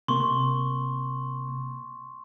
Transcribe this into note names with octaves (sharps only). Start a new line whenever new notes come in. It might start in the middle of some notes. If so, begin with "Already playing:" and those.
C3 A#3 C6 C#6